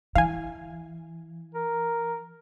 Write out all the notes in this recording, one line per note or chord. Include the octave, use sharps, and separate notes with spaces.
E3 F5 G#5
A#4